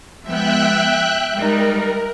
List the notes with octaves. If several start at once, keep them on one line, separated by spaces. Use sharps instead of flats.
F3 G#3 B3 E5 G5 F#6
G3 G#3 D#4 A#4